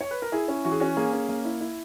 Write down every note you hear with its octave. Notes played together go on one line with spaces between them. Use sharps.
C#5
B4
A#4
E4 G#4
C#4
E3 F#4
G#4
C#4 F#4
A#3 G#4
C#4
A#3
E4
E4